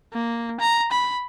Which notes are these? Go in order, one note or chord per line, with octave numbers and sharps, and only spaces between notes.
A#3
A#5
B5